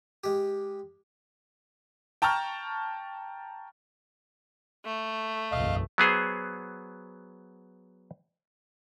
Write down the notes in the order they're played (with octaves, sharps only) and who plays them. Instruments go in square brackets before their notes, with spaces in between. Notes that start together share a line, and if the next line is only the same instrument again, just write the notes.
[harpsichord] G#3 G4
[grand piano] G5 A5 A#5 C#6 F6
[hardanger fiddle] A3
[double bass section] F#1 B1 E2 [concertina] D#5 F5
[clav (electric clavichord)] F#3 B3 G#4 C5